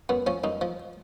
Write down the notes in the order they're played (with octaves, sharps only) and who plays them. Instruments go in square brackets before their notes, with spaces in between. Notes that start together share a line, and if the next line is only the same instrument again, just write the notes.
[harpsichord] F#2 B3
F3 C#4
F#2 D#4
F3